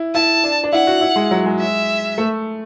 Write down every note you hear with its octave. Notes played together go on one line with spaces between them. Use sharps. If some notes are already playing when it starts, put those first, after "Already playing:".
Already playing: E4
E4 A5
D4
D4
E4 F#5
F#4
E4
G#3
F#3
G#3
E5
A3